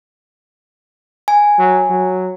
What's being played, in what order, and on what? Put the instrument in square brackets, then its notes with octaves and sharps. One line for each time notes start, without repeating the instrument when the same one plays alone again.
[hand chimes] G#5
[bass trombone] F#3
F#3